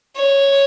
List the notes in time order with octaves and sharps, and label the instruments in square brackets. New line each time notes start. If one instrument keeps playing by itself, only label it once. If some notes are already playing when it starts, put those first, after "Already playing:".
[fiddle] C#5